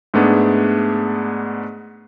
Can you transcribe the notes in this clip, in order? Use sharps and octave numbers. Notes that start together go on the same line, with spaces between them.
G#2 A3 B3 D4 G#4